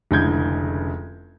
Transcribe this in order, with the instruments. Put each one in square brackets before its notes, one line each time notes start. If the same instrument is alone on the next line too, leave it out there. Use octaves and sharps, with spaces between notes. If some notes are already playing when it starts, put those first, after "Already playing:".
[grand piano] F1 C#2 D3 E4 G6 G#6